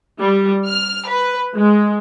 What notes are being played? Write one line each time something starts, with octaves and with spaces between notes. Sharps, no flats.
G3
F6
B4
G#3